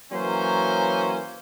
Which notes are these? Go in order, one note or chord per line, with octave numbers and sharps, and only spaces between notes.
E3 F#3 A#3 C#4 C5